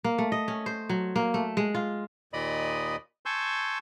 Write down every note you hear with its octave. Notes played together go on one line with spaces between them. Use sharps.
A#3
A3
D#5
C#4
C5
F#3
A#3
A3
G#3
F4
D#2 A#2 D5 D#5 B5 D#6
G#5 A5 C6 C#6 E6 G6